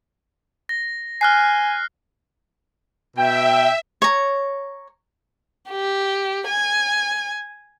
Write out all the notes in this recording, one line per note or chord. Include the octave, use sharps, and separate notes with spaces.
A#6
G#5 F6 F#6 C7
B2 E5 G5
C#5 A#5
G4
G#5